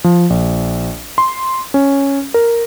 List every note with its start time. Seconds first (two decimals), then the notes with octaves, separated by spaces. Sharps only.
0.04 F3
0.30 A#1
1.18 C6
1.74 C#4
2.34 A#4